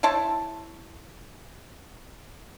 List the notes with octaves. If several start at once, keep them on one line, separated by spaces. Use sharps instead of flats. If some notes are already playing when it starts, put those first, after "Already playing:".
E4 C5 C#5 A5